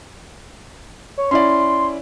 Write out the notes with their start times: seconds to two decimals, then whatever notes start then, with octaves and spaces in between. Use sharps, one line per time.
1.18 C#5
1.31 C#4 E4 D5 C6